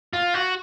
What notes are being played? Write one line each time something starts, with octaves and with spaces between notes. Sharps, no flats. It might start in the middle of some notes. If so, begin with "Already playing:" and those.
F4
F#4